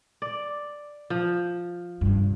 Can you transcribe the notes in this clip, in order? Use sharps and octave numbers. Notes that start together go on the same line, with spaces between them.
D5
F3
G2 C3